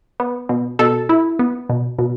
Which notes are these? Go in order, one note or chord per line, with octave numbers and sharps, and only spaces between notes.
B3
B2
B2 A4
E4
B3
B2
B2